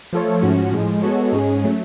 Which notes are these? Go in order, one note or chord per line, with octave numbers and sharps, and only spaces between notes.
F3 A3 F4 A4 C#5
G#2 F3 A3 C#4 F#4
A2 F3 G#3
G#3 B3 F#4 A4 C#5
G#2 G#3 C#4 G#4
F#3 A3 C#4